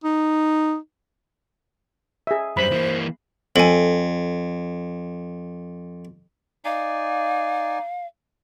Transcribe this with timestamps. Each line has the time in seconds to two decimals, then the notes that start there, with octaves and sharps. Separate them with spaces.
0.04 D#4
2.27 G#4 E5
2.57 F#2 G3 C5 B5
2.72 E3 A#3
3.56 F2 A4 G#5
6.65 D#4 D5 F5 G#5